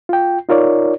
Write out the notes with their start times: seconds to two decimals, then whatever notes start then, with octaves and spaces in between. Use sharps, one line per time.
0.09 F4 G5
0.49 D#4 F4 A#4 C#5 D5